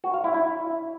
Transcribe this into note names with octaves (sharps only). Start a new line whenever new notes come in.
F#4
F5
E4
E4